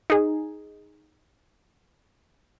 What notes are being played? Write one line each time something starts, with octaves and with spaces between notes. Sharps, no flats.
D#4 G#4